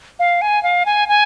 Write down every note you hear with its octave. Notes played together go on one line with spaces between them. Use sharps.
F5
G#5
F5
G#5
G#5